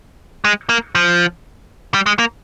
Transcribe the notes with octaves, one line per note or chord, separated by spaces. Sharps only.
G#3
A#3
F3
G3
G#3
A#3